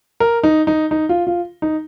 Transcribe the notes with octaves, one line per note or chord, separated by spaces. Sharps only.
A#4
D#4
D#4
D#4
F4
F4
D#4